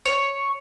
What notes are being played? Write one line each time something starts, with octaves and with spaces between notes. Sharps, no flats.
C#5